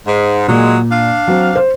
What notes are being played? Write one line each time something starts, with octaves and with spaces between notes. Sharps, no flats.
G#2
A#2 F#3 G#3
D4 F5
F#3 C4
C5